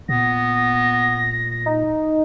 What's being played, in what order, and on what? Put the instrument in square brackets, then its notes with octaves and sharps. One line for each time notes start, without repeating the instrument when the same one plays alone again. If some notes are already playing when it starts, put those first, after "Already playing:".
[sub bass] A#2 [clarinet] B3 [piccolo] A#6
[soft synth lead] D#4